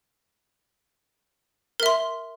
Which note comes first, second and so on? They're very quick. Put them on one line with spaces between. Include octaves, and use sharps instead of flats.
A#4 E5 C6